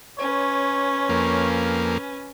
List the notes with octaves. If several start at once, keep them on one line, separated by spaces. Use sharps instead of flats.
C#4 B4 C#5
F2 A#3